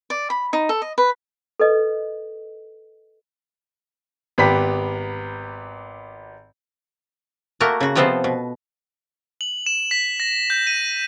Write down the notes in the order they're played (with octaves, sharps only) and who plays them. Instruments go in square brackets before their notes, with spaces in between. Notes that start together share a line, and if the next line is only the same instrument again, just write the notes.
[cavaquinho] D5
B5
D#4
A4
D#5
B4
[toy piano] A4 B4 D#5
[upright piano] G#1 B3 G4 B5 B6
[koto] A3 A#3 F#4 A#4
C#3 F#4
C3 F3 B3 C4 A4 C5
B2
[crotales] F#7
E7
B6
A#6
G6
D#7